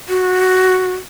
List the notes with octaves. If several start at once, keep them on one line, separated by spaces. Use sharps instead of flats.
F#4